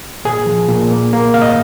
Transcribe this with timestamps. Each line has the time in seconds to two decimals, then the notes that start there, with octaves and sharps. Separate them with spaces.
0.25 A#2 G#4
0.46 F3
0.68 A#2
0.91 A#3
1.13 A#3
1.34 C3 F5
1.42 D#5